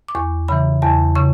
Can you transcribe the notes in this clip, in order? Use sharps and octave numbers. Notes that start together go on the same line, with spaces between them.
D6
E2 C#6
C#3 E3 B5
E2 A5
C#3 C#6